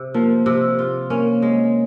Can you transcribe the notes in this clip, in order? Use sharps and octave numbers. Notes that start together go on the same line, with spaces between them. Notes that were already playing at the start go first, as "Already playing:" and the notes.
Already playing: C3
F3 A#3
C3
F4
A#3 C#4
G#3